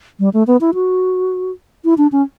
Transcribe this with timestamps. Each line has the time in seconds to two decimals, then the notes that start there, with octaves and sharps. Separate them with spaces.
0.20 G3
0.34 A3
0.47 B3
0.61 E4
0.74 F#4
1.85 E4
1.98 D4
2.12 C#4